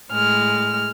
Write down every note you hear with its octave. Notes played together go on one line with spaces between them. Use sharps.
A2 G#3 F6